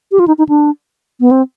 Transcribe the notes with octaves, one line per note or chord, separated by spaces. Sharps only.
G4
F4
D#4
D#4
D4
B3
C4